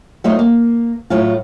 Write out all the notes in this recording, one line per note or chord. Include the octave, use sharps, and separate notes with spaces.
F#3 A3 D#4 F4 C5 D#5
A#3
A2 F#3 F4